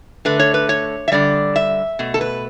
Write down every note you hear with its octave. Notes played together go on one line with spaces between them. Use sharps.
D3 A3 B4
C#5
B4
C#5
E5
D3 G3 D5
E5
B2 A3
A4
B4